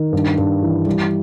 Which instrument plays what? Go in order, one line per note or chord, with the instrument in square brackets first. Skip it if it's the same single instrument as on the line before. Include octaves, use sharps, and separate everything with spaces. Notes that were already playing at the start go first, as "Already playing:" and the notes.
Already playing: [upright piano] D#3
G2
G2
E3
G3